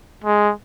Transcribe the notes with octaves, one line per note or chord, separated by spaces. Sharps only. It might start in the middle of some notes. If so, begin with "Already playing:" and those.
G#3